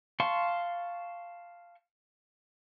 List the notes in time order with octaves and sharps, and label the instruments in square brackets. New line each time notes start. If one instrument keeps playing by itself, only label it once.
[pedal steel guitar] F5 A5 C6 C#6